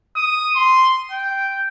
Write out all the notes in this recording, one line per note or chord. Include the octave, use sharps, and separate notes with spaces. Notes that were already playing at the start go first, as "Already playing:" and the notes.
D#6
C6
G5